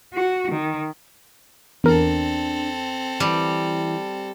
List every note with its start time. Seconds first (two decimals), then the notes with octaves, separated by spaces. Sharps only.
0.14 F#4
0.51 D#3
1.84 E2 C4 D4 A4 A#4
3.20 E3 G3